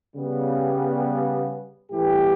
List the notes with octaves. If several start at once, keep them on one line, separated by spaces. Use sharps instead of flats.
C#3 G3 B3
A2 E3 G3 B3 G4